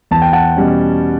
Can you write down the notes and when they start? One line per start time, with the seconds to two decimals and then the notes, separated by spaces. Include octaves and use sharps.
0.11 E2 A5
0.22 G5
0.33 F#5 A5
0.57 B2 G3 C#4